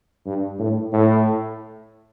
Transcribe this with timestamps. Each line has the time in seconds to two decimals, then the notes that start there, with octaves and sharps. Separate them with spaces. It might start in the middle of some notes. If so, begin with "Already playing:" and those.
0.26 G2
0.59 A2
0.92 A2